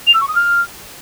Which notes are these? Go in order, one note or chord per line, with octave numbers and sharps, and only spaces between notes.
F7
E6
C#6
D#6
F6